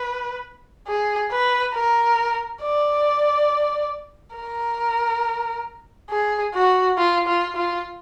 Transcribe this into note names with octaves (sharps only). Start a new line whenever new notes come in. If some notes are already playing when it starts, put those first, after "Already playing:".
Already playing: B4
G#4
B4
A#4
D5
A#4
G#4
F#4
F4
F4
F4